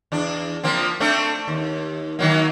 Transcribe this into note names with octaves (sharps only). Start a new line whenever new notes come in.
E2 D4
F3 A#3 C4
A3 C4 D4
D#2
D#3 F#3 A#3